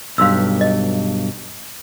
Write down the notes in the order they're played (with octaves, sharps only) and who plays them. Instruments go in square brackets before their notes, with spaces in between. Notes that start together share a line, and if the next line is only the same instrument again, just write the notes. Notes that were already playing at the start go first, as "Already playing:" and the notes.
[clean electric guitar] B1 G2 [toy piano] F5 C6 E6
[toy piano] D#5